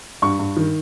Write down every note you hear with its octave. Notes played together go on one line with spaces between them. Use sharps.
G2 C#6
G2
D#3